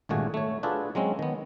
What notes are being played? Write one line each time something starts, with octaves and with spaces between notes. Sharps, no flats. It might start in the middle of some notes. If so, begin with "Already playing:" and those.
G#1 G2 A#2 A3 F#4 G#4
A3 C#5
D4 F4 F#4 G#4 A4 B4
F#3 G#3 C4 C#4
D#3 B3